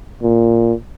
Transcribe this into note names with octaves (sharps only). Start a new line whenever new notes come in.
A#2